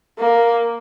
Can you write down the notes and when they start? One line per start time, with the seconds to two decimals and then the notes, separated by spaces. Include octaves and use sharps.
0.19 A#3